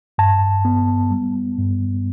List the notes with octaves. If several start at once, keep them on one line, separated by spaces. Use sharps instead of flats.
G2 A5
B3
G3
G2